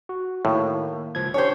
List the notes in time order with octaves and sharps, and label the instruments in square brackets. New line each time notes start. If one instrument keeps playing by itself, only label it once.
[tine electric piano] F#4
[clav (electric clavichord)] A2 [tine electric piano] D#3 A#3
[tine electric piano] C#2 F3 G#6
[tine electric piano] C#4 D4 G4 [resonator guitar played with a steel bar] C5 C#5